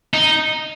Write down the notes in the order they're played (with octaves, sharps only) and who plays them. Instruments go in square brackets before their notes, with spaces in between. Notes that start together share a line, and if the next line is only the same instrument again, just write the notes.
[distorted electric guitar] D#4